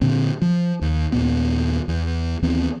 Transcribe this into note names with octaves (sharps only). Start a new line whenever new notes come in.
A#2 D3 C4
F3
D#2
D#2 A#2 B3
E2
D#2 E3 B3 C4